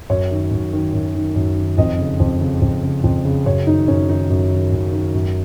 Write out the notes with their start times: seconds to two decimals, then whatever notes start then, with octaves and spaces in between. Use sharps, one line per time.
0.10 F#2 C#5
0.31 D#3
0.51 F#2
0.73 D#3
0.94 F#2
1.15 D#3
1.36 F#2
1.57 D#3
1.78 F2 D#5
1.99 C#3
2.20 F2
2.41 C#3
2.62 F2
2.83 C#3
3.04 F2
3.25 C#3
3.46 F#2 C#5
3.67 D#3 D#4
3.88 F#2 C#4
4.09 D#3 D#4
4.30 F#2
4.51 D#3
4.72 F#2
4.93 D#3
5.14 F#2